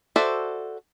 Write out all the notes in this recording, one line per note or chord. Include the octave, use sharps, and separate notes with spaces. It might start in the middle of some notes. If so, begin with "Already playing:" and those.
F#4 A4 C5 D5 E5